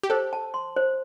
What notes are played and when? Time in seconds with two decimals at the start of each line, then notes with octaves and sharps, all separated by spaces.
0.03 G4
0.10 A4 C5
0.33 A5
0.54 C6
0.76 C5